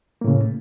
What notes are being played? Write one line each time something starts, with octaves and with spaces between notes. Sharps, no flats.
A2 C#3 A#3